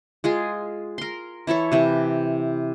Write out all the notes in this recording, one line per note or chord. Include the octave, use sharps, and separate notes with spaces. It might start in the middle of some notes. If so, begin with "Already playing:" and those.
G#3 F4 G#4
A#4 C6
E3 E4 A4 C#5
C3 E3 G4